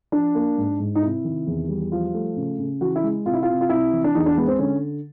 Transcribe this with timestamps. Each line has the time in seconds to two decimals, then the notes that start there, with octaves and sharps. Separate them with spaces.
0.12 F3 D4
0.35 A#3
0.57 G#2
0.79 G#2
0.95 D#4
1.02 C3 E4
1.24 D#3
1.47 E2
1.69 G3
1.91 F3 F4
2.14 A3
2.36 C#3
2.58 C#3
2.81 E3 F#4
2.96 E4
3.03 G#3
3.25 C3 F4
3.33 E4
3.42 F4
3.48 C3
3.61 F4
3.69 C3 E4
3.92 E3
4.04 D4
4.15 E2 D#4
4.26 D4
4.37 G#3 B3
4.48 C4
4.59 D3 C#4